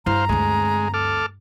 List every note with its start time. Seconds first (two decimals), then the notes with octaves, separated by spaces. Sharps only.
0.06 G2 E4 C5 F5 A#5
0.29 D2 G#3 C4
0.94 A4 D6 F6